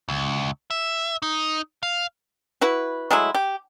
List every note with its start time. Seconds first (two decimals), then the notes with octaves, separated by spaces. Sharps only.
0.09 C#2
0.71 E5
1.22 D#4
1.83 F5
2.61 E4 F#4 B4
3.10 F#3 G#3 A3 E4
3.35 G4